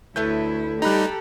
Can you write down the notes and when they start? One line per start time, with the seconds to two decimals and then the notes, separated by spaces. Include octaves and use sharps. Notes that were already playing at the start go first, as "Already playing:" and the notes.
0.16 D2 A3 E4 B4 C#5 G6
0.82 G3 D#4 G4 A4 A#5 B5 F#6